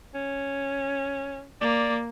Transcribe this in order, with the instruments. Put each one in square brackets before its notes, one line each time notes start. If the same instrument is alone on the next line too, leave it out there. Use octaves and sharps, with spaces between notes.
[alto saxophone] C#4
[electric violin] A#3 [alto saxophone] D5